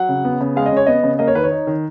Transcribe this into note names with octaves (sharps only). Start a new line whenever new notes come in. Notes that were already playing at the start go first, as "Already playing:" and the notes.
Already playing: F#3 F#5
C#3
B3
C#3
G#3 F5
D#5
C#3 C#5
B3 D#5
C#3
A#3 D#5
C#5
D#3 B4
C#5
D#4
D#3